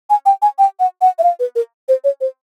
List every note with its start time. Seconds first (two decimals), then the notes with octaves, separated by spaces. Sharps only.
0.10 G#5
0.26 G5
0.42 G#5
0.59 G5
0.80 F#5
1.02 F#5
1.19 E5
1.23 F5
1.40 B4
1.56 A#4
1.88 C5
2.04 C#5
2.21 C5